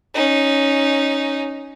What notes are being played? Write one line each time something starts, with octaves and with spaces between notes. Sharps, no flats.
C#4 D#4